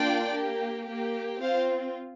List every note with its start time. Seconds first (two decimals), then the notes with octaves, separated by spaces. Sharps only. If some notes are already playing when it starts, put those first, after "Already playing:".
Already playing: A#3 D4 F4 D5 G5
0.33 A#3 G4
0.87 A#3 G4
1.41 C4 F4 C5 F5